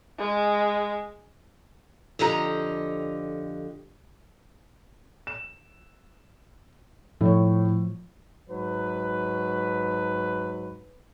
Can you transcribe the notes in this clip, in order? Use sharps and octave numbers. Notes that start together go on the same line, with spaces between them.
G#3
F2 D3 G4 D#5 A#5
E7
A2 F3 C#5
G#2 F#3 B4